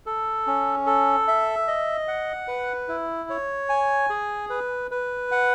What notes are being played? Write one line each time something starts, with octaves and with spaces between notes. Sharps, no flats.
A4
C#4
A4
E5
D#5
F#5
B4
E4
C#5
G#5
G#4
B4
B4
F#5